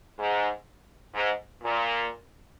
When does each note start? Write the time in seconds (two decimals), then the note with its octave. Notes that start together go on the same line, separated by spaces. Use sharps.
0.18 G#2
1.15 G#2
1.63 A#2